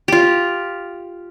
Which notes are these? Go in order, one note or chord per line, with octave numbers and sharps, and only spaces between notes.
F4 G4